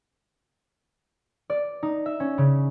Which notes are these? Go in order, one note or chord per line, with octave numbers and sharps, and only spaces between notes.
D5
D#4
E5
C#4
C#3